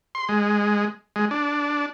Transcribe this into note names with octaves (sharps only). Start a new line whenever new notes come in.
C6
G#3
G#3
D4